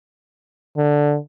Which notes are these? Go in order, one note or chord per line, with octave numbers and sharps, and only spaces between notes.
D3